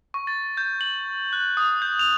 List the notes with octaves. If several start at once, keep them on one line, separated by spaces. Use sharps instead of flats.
C#6
A6
G6
F#7
F#6
D#6
G6
F7